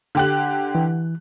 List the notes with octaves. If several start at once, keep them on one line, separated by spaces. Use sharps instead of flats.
D3 G4 F#6
E3